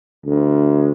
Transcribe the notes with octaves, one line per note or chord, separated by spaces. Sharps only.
D2